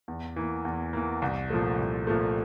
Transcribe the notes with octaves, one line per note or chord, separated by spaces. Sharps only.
E2
E3 A#3
E2
E3 A#3
C2
A#2 F3 A3
C2
A#2 F3 A3